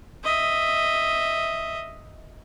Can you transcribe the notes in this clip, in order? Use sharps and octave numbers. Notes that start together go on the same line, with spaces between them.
D#5 E5